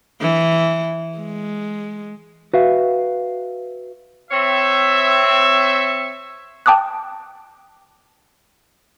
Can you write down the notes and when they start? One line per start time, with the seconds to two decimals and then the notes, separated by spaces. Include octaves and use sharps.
0.21 E3
1.18 G#3
2.53 F#4 B4 E5 F5
4.31 C4 C#5 E5
6.66 G5 A5 D6 D#6 F#6